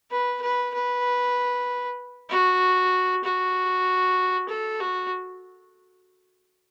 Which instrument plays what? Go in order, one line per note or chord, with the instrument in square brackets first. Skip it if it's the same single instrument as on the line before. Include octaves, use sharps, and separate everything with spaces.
[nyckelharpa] B4
B4
B4
F#4
F#4
A4
F#4